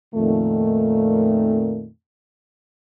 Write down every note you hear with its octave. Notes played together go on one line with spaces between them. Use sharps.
F2 A#2 D#3 A3